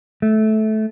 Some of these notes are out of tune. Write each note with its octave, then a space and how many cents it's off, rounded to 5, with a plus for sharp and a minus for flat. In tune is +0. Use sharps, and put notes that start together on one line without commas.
A3 -15